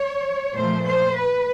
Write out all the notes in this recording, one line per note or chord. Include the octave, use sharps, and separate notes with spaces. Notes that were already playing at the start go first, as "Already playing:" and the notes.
Already playing: C#5
A#2 F3 A3 C5
C5
B4